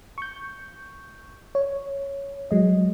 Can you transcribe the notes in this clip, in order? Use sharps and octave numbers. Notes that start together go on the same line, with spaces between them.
C#6 G6
C#5
F#3 G#3 D#5